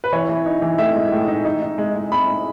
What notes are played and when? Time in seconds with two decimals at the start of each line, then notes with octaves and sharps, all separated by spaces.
0.04 B4
0.13 E3 C#5
0.29 E3
0.46 D#4
0.62 E3
0.78 A2 E5
0.96 G#3
1.12 A2
1.28 D#4
1.45 D#4
1.62 D#4
1.78 G#3
1.95 G#3
2.12 G#3 B5
2.28 D#4